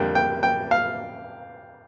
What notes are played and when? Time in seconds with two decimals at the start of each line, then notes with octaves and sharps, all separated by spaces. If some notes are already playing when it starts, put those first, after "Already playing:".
Already playing: F2 D3 G3 A#3 G5
0.15 G5
0.43 G5
0.71 F5